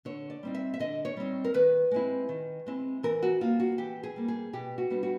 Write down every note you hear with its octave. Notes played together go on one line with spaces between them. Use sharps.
D3 C#5
D5
G3 C4 D#4
E5
E5
D3 D#5
C#5
G3 C4 D#4
A#4
D#3 B4
G#3 C4 E4
D#3
G#3 C4 E4
E3 A#4
F#4
G3 A#3 F4
F#4
E3 G4
G#4
G3 A#3
G#4
B2 G4
F#4
G3 B3 D4
F#4